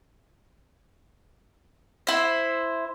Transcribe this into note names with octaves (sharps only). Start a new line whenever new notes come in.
E4 C5